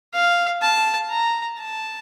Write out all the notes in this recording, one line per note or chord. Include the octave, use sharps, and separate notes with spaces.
F5
A5
A#5
A5